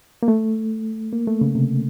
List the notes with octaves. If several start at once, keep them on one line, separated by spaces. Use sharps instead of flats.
A#3
A3
A#3
A3
C#3
C3